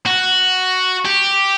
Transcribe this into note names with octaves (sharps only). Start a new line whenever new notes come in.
F#4
G4